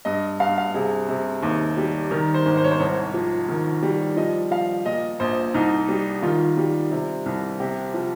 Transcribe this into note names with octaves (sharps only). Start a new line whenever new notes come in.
G2 D#5
G2 F5
F5
C3 G#4
C3
D#2
G3
D#3 A#4
C5
G#1
C5
C#5
C5
C2 C#5
F3
D#3
G3
F3 D#5
F3 F5
A#2 D#5
A#1 C5
C2 D#4
G3
D#3 F4
G3
C3
C2
C3 G4
F3